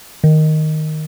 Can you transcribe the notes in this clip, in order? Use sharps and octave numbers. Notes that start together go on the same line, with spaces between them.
D#3